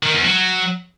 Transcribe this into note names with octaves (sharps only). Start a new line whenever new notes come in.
D#3
E2
F#3